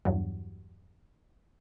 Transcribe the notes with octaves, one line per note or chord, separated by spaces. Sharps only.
E2 G2 F#3